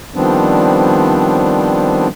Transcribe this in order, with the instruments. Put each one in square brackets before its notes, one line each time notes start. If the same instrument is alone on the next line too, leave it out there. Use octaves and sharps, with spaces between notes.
[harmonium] D#3 F3 G3 B3 C4 D4